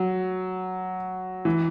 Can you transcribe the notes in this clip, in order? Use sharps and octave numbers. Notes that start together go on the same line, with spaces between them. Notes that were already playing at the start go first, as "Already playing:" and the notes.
Already playing: F#3
E3